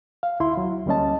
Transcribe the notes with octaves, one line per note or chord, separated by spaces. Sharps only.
F5
D2 E4 C6
F#3
D2 G3 A#3 C#4 D#5 A5